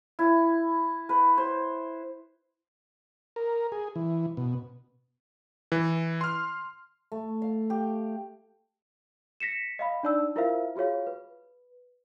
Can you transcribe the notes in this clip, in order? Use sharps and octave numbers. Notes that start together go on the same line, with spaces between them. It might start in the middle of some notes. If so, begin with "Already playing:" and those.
E4
B4
C5
A#4
G#4
E3
B2
E3
C6 F6
A3
F5
G4
A#6 B6 C#7 E7
D#5 F5 B5
D4 D#4 D5 A5 E6
E4 F4 A#4 C5 E5 F5
F4 F#4 G#4 C#5 F5
B4